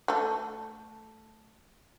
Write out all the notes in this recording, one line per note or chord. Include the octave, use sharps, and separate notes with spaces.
A3 A4